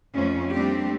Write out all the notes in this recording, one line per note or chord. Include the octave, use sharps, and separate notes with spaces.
F2 A3 C#4
G3 A3 A#3 C4 D4 G4